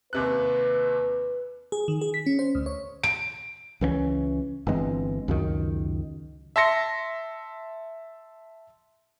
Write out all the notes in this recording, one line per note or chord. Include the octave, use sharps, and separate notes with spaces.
D#2 C3 B4 F#6
G#4
D#3
G#4
B6
C#4
C5
D2
C#5
D7
C#2 E3 A3 C#4
G1 E3 G#3 C4
C#2 F#2 D#3
E5 A5 C6 A#6 C#7